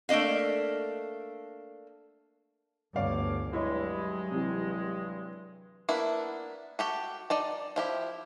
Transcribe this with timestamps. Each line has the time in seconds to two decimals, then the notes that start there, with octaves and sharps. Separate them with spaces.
0.09 A3 A#3 D4 D#5 F5
2.96 G1 D2 G2 C#5 D5 F5 D6
3.53 G2 F#3 G#3 E4 C#5 D#5
4.31 C3 E3
5.89 A#3 B3 D4 E4
6.79 F#4 G4 A4
7.30 D#4 D5 A5
7.76 F3 E4 G4